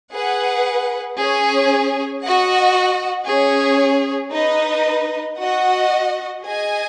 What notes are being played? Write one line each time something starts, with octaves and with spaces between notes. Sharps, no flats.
G#4 B4 F#5
C#4 G#4 C#5 G#5
F#4 D#5 F#5
C#4 G#4 C#5
D#4 B4 D#5
F#4 D#5 F#5
G#4 D#5 G#5